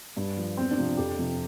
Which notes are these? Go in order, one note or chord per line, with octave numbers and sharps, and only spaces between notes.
G2
F3
E2 C4
D4
C3 F3
F2 G4
C3 F3